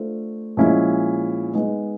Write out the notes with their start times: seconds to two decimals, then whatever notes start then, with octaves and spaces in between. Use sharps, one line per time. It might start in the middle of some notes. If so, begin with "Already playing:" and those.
Already playing: A3 D4 F4 A4 C5
0.57 A#2 F3 G#3 C#4 E4
1.53 G#3 B3 D#4